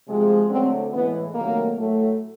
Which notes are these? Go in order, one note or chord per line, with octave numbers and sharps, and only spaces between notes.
C3 F3 G#3
D3 F#3 A3 C4
A2 E3 G#3 B3
C3 D#3 F#3 A3 A#3
A2 F#3 A3